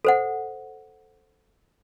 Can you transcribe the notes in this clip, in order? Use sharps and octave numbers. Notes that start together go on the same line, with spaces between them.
A4 C5 F#5